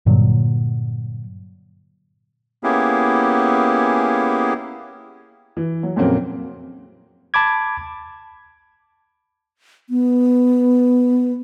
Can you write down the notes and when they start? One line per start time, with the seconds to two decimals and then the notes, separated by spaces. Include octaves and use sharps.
0.06 G2 A#2 D3 F#3
2.64 A#3 B3 C#4 E4 G4 G#4
5.57 E3
5.83 F#3
5.96 F2 A#2 C#3 F#3 A#3 C4
7.34 A5 B5 D6 G#6
9.90 B3